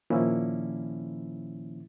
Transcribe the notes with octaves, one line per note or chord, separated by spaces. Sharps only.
A#2 D#3 F3 A#3 C#4 E4